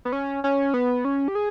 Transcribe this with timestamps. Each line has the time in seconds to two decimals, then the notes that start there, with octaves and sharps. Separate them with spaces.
0.05 B3
0.12 C#4
0.44 C#4
0.74 B3
1.05 C#4
1.28 G4
1.35 G#4